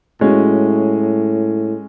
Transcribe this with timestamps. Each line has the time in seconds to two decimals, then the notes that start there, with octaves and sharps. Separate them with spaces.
0.21 A2 G#3 C#4 F#4